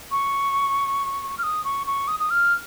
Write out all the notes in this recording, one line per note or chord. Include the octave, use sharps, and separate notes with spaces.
C#6
F6
D#6
C#6
C#6
D#6
D#6
F6